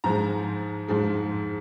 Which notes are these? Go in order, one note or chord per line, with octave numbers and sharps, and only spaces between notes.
G#2 F3 G#3 A#5
G#2 F3 G#3